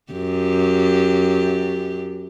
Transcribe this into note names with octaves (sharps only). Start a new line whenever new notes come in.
F#2 G4